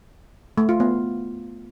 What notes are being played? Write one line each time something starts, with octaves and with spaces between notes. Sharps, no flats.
A3
F4
B3